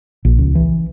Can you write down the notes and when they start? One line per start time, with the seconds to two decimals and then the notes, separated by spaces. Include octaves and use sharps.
0.25 A#1
0.38 C#2
0.55 E3